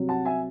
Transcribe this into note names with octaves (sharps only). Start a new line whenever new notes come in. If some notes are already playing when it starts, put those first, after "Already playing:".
Already playing: C2 C3 F#3
F#5 A5
E5 G#5